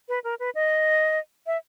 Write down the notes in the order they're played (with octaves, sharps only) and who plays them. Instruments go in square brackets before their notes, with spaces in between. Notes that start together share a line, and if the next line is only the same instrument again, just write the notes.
[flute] B4
A#4
B4
D#5
E5